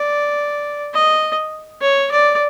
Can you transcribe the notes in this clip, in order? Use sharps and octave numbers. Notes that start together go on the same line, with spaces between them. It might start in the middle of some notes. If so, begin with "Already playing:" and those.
Already playing: D5
D#5
C#5
D5